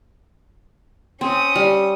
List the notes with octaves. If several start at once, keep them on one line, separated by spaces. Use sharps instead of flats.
C4 C#4 D#6
G3